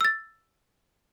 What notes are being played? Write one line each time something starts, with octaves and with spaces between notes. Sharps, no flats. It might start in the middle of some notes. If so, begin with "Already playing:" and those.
E6 A6